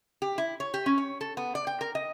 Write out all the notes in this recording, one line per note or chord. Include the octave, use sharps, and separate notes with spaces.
G4
E4
C#5
G4
C#4
C#5
A4
B3
D5
G5
A#4
D#5